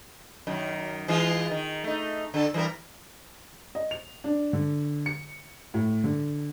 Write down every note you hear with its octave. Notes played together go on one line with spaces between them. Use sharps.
F#2 D#3
E3 G#3 F4
D#3
A3 D#4
D3 A4
E3 G3 A#4
D#5
F7
D4
D3
C#7
A2
D3